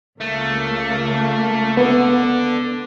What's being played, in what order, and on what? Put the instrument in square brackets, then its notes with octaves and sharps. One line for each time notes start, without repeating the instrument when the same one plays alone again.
[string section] C#2 A#3 [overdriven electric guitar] A3
[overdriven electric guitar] D3 [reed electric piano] B3